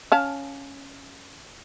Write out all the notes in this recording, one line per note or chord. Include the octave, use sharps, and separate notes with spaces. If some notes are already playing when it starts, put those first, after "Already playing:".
C#4 F5 A5